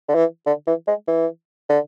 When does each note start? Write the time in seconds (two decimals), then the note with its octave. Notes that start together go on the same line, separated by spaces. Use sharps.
0.08 D3
0.15 E3
0.46 D3
0.67 E3
0.87 G#3
1.08 E3
1.69 D3